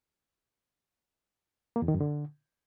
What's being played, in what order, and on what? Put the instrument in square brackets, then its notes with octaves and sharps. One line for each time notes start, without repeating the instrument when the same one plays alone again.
[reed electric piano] A#3
E2
D#3
F#2
D3